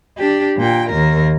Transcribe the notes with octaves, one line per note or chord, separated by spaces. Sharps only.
D4 G4
A#2 G5
D#2 A#4